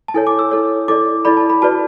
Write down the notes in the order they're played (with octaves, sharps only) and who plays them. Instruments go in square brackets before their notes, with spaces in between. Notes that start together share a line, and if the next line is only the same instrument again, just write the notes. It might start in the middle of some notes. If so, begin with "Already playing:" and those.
[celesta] A5
E4 A4 C#5 G#5
D6
E6
E4 A4 C#5
E4 A4 D5 D6
E4 A4 D5 B5
A5
B5
F#4 B4 D5 A5